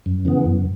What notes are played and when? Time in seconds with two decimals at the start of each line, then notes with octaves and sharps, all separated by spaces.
0.06 F#2
0.25 C#3 E3 B3
0.45 F#2